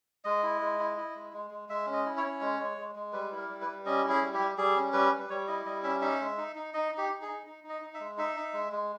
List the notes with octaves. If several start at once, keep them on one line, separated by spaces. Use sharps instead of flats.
G#3 D#5
E4
G#3
E4
E4
G#3
G#3
G#3
G#3 E5
C#4
D#5
E4
C#5
C#4
G#3
G#3
G#3
G#3
G3 B4
E4
A#4
G3
B4
G3
C#4 D#5
E4
G#4
G3
G4
G3
G3 G#4
C#4
G3 B4
G3
B4
G3 C#5
E4 D#5
G3 D#5
C#4 E5
D#4 E5
G#3
D#4
D#4
D#4 D#5
D#4
G4
D#4
G#4
D#4
D#4
D#4
D#5
D#4
E5
G#3
D#4 E5
D#4
G#3
G#3